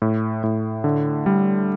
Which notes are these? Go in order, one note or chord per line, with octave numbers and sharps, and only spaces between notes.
A2
A2
D3
G3